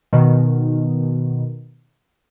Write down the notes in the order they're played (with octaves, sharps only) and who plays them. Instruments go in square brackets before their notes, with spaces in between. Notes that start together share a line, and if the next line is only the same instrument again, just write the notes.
[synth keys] B2 D#3